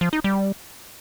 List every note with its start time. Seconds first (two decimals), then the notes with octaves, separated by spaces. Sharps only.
0.01 F3
0.13 D#4
0.24 G3